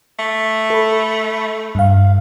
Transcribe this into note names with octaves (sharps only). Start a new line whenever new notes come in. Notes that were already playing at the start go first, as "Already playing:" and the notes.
A3
A4 B5
G2 F5